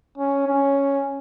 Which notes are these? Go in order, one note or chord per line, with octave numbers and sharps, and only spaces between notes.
C#4
C#4